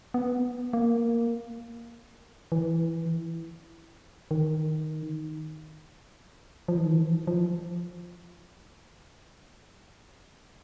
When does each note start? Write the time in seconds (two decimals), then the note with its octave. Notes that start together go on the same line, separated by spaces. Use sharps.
0.14 B3
0.73 A#3
2.52 E3
4.31 D#3
6.68 F3
6.77 E3
6.85 D#3
6.93 E3
7.27 F3